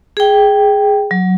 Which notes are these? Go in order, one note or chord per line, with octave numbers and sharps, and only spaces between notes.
G#4 G5
F#3